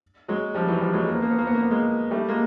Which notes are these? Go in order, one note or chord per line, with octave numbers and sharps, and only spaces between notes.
F#3 G#3
F3 G3
E3 F#3
F3 G3
F#3 G#3
A#3
B3
A#3
B3
A#3
B3
A#3
B3
G#3 A#3
G3 A3
G#3 A#3